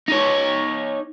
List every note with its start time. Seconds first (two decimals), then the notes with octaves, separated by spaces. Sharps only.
0.08 D#4 C#5